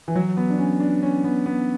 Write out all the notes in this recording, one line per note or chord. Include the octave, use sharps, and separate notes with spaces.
E3
F#3
B3
D4
C#4
D4
C#4
B3
B3